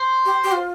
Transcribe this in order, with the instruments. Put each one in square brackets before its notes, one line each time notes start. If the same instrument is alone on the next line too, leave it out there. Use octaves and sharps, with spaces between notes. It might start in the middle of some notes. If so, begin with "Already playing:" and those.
Already playing: [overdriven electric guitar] C5
[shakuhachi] G4
G4
F4